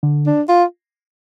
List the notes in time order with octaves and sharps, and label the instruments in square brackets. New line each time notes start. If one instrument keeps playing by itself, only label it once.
[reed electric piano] D3
[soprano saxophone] D4
F4